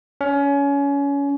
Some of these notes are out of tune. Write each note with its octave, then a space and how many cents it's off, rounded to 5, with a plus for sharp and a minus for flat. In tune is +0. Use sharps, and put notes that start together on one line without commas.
C#4 +25